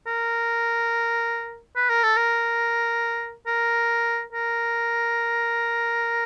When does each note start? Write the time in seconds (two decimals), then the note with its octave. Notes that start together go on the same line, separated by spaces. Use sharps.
0.06 A#4
1.76 B4
1.90 A#4
2.03 A4
2.16 A#4
3.47 A#4
4.32 A#4